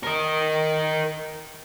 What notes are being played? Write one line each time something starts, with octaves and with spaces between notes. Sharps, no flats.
A#4 D#5